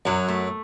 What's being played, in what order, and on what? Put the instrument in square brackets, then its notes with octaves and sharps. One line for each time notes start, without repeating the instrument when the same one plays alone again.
[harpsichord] F#2 [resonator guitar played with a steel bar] F#3
[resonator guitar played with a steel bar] A3